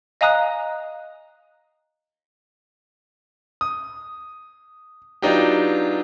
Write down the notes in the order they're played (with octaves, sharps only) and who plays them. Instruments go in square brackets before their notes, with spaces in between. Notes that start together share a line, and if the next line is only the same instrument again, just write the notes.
[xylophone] D#5 F5 G#5 A#5 D#6 F#6
[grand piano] D#6
F#3 B3 D4 D#4 F4 G4